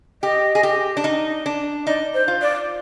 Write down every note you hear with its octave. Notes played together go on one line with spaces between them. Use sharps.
G4 D#5
G#4
G4
D4
D#4
D4
D#4 D5
C5
F4
D5